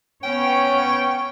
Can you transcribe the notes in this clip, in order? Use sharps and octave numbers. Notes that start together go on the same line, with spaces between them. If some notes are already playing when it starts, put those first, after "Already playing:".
B3 C#4 C#5 G5